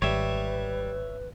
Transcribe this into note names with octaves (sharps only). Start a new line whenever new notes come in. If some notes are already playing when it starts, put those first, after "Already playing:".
G#1 G3 B4 C#5 E5